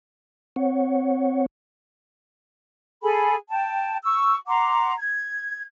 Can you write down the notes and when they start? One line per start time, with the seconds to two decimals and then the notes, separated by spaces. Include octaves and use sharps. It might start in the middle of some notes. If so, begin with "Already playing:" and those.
0.56 C4 C#5 F#5
3.02 G#4 A4 G#5 B5
3.49 G5 A5
4.04 C#6 E6
4.47 F#5 A#5 C6 D6
4.99 G#6